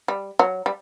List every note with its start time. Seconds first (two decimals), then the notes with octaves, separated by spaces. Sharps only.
0.08 G3
0.39 F#3
0.66 G3